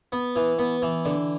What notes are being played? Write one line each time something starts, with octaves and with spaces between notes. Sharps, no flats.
B3
E3
B3
E3
D3